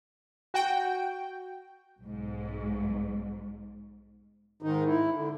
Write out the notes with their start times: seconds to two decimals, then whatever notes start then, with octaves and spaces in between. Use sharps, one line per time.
0.54 F#4 G5
2.01 B1 G#2
4.62 G#2 D#3 D#4
4.86 E4
5.14 D3